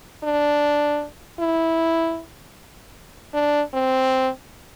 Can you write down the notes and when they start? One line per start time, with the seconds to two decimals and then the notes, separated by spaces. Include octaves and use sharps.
0.24 D4
1.40 E4
3.34 D4
3.74 C4